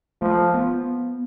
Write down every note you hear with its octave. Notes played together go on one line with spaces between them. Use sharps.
F3 A3
B3